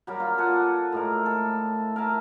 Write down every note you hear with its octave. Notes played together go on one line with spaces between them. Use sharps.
F#3 G3 A#4
F4
A4 D5 F#5 G#5
A2 G#3 A#4
A4
A#4 E5 G#5 A5